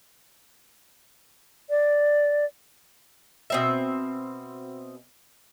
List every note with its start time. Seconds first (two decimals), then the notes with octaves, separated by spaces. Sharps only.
1.70 D5
3.50 B2 C4 E5